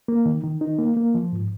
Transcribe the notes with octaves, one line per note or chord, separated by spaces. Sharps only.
A#3
D#3
D#3
D#4
A#3
A#3
F3
G#2